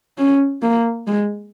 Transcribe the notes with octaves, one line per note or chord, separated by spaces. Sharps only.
C#4
A#3
G#3